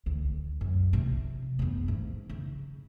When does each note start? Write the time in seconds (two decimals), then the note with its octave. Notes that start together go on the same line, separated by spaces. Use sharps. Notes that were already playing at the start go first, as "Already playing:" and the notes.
0.06 D2
0.61 F#2
0.93 C3 F3
1.59 F2 B3
1.88 G#2
2.30 C#3